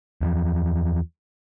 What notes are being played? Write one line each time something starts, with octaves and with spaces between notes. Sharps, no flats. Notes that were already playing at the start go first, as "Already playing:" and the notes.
E2 F3